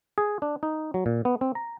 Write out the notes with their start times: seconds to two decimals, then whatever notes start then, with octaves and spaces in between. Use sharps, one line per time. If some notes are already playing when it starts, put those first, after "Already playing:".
0.18 G#4
0.42 D4
0.63 D#4
0.94 F#3
1.06 A#2
1.25 B3
1.41 C4
1.55 A#5